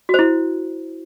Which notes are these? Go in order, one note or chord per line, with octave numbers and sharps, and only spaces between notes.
E4 F#4 C5